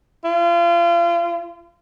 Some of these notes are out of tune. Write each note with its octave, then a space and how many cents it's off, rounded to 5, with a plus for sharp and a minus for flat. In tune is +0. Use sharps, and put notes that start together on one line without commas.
F4 -35